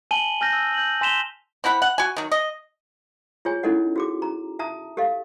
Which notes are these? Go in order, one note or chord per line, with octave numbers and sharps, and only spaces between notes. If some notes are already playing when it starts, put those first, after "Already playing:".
G#5 A5 D#7 F#7 G7
G#5 F6 G6 A#6
E6
G6 F#7
G#5 C6 B6 E7 F7 G7
C4 E4 F#5 B5
F#5
F#4 G#5
D#3 F#3
D#5
F4 G#4 C#5 G#5
C#4 D#4 E4 A4 D#5 F#5
F#4 G#4 D6
A#5
E5 A5 A#5 D#6
G4 A4 D#5 F5